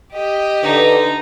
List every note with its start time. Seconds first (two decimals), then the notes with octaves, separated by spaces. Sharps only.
0.14 G4 D#5
0.63 D3 E3 D#4 B4